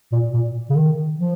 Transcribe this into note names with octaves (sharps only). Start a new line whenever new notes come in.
A#2
A#2
C#3
D#3
F3